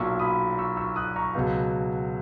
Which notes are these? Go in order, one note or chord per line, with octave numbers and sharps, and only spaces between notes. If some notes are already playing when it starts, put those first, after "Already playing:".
Already playing: B1 A#2 F#3 C#6 E6
B5 D#6
C#6 E6
C#6 E6
D#6 F#6
A#5 C#6
C#2 B2 F#3